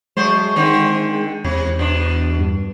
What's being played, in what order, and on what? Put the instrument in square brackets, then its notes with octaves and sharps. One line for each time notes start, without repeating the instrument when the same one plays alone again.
[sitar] F#3 A3 C5 [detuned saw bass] G#3
[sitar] D3 D#3 C4
[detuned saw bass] E2 [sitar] C3
[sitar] B2 D4
[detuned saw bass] G2